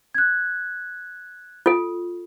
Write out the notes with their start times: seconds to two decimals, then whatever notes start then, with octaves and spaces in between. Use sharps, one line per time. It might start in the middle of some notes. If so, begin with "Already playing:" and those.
0.15 F#6 G#6
1.66 F4 A4